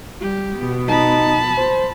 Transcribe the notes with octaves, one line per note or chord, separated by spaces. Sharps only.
G3 G4
B2 B3
D#4 A5 B5
C5